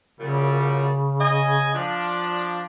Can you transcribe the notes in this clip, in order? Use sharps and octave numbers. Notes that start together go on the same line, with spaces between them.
F#2 A#2 C#3 G3
D#5 G#5
F3 D4